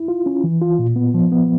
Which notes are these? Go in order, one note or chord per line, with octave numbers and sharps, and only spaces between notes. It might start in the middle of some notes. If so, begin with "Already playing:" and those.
Already playing: E4
F4
C#4
E3
F4
A#2
B3
F3
B3